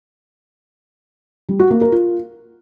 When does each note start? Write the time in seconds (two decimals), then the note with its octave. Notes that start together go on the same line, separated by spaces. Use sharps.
1.49 G3
1.59 F#4
1.70 A#3
1.81 A#4
1.92 F4